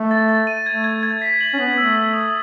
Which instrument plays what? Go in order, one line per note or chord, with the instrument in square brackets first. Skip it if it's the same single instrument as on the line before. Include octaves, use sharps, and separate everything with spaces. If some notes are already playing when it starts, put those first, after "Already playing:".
Already playing: [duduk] A3
[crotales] A6
A6
D#7
[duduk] A3 [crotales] G#6
[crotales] G#6
G#6
B6
F#7
[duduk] C#4
[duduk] B3 [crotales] F#7
[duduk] A3 [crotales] E6
[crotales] B6
D#6